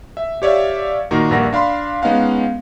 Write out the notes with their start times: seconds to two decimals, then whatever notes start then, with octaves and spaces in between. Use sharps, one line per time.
0.17 E5
0.42 G4 C#5 D5 E5 F5
1.11 A#2 D#3 D#4 F#4 A#4
1.31 A#1 G2 A#3 A#4 F#5 A#6
1.53 D4 F5 B5 C6
2.02 G#3 B3 C#4 D#4 F5 F#5